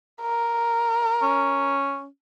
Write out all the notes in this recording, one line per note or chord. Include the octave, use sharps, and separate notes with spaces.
A#4
C#4